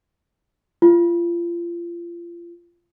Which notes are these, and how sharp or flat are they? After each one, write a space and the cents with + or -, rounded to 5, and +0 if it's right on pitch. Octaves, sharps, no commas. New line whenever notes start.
F4 -30